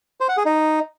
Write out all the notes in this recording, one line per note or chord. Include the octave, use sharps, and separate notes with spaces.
C5
F#5
G#4
D#4